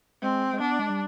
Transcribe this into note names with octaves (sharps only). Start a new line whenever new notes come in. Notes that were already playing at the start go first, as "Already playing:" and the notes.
G#3 C4
G#3
B3 D4
G#3
G3